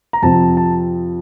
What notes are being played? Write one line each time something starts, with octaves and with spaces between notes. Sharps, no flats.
A#5
F2 C3 F3 C4 A5
A5